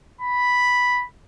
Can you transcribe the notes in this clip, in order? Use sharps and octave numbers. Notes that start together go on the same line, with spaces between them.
B5